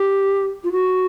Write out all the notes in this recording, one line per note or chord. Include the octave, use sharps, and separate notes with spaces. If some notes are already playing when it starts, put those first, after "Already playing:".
Already playing: G4
F4
F#4